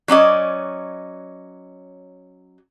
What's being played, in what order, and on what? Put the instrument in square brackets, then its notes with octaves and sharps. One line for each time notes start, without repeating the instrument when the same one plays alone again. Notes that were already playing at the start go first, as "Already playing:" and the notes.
[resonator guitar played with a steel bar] F#3 C#4 D5 D#5